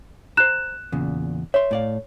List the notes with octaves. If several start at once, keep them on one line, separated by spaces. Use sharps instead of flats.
C5 A#5 F#6 E7
E2 A#2 C#3
C#5 E5 C6
A2 D5 F5